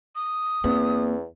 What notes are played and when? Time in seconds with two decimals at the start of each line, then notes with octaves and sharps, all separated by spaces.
0.16 D#6
0.64 E2 A#3 C4